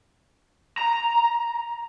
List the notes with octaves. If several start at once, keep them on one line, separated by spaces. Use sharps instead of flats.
A#5